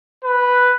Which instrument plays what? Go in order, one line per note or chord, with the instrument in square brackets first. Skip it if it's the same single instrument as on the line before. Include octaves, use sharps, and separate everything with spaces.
[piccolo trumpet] B4